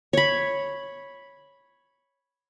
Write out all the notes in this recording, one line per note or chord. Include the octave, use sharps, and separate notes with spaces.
C#5 B5